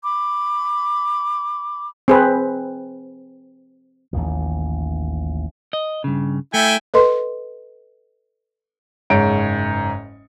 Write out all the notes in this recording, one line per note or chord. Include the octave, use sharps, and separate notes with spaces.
B5 D6
C4 G#4 B4
A1 D#2 D#3 F3
D#5
G2 C#3
A3 E4 G5 G#5
A4 B4 D#5 C6
F#1 G#2 C#5 D7